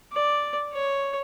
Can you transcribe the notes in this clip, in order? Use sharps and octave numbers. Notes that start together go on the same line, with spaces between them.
D5
C#5